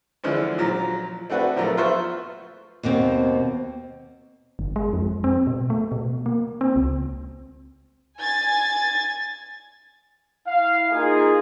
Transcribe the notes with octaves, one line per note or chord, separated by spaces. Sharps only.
D3 E3 F3 G#3 C#4
A#2 F3 F#3
A3 C4 D4 F#4 B4
A#2 F3 F#3 A3 B3 A#4
F4 B4 C5 E5 C#6
D#2 B2 A#3 C4
G1
G#3
F2
C4
B2
A3
B2
A#3
C4
C#2
G#5 G#6 A6
E4 F5
A#3 D#4 F4 G#4